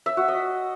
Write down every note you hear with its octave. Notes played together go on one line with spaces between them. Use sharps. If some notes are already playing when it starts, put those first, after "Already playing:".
E5
F#4
D#5